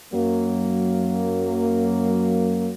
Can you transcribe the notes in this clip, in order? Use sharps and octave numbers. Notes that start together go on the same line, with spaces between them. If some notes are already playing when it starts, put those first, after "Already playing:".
F#2 F#3 A#3